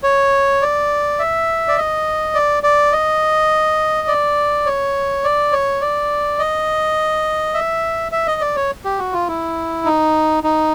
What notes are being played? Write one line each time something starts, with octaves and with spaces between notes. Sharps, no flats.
C#5
D5
E5
D5
D#5
D5
D5
D#5
D5
C#5
D5
C#5
D5
D#5
E5
E5
D#5
D5
C#5
G4
F#4
F4
E4
D#4
D#4